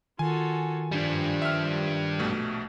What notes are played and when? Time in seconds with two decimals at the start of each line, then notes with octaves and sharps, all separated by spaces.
0.19 D#3 F4 F#4 A4 G#5
0.92 G2 F3 G3 D4
1.42 E5 F6
2.19 A#1 B2 A3